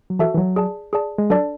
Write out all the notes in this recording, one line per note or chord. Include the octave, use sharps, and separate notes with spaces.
F#3
E3 F#4 A4 E5 A5
E3
F#3
G#4 D5 A5
G#4 D5 A5
G#3
F#3 D4 A4 D5 A5